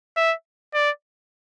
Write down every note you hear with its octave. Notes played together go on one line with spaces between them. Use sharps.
E5
D5